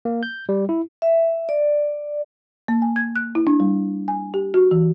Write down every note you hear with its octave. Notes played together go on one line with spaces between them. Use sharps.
A#3
G6
G3
E4
E5
D5
A#3
G#5
G#6
F#6
E4
D4
G3
G#5
G4
F#4
E3